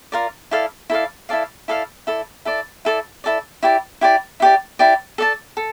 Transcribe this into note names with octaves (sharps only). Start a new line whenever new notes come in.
F4 A#4 D5
E4 A4 D5 F5
E4 A4 D5 F5
E4 A4 D5 F5
E4 A4 D5 F5
E4 A4 D5
E4 A4 D5
E4 A4 D5
E4 A4 D5
E4 G4 D5
E4 G4 D5
E4 G4 D5
E4 G4 D5
A4 D5 A5
A4